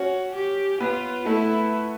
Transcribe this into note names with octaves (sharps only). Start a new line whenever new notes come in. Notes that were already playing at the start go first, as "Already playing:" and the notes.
Already playing: C#4 F#4 C#5
G4
B3 F4 B4
A3 E4 A4